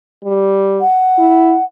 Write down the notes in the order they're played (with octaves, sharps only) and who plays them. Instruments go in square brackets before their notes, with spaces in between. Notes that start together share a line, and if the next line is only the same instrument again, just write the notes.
[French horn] G3
[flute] F#5
[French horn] E4